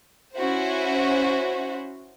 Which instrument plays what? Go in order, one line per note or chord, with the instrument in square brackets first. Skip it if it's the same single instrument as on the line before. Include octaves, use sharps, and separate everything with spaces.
[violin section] C#4 E4 F#4 C5